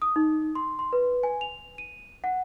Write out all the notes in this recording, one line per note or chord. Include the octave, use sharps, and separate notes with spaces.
D#6
D#4
C6
C6
B4
G#5
F7
D#7
F#5